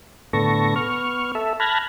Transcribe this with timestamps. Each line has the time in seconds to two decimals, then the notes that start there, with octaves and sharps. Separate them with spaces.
0.33 A2 D3 B3 A4 C#6 A#6
0.76 B3 C#6 F6
1.35 A4 E5
1.60 A5 B5 F6 F#6 G#6 A#6